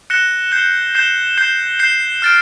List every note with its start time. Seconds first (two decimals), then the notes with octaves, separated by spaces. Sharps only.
0.10 F#6 A#6 C#7 E7 G7
0.52 G6 C7 E7 G7
0.94 G6 C7 E7 G7
1.38 G6 C7 E7 G7
1.79 G6 C7 E7 G7
2.22 F6 A6 D7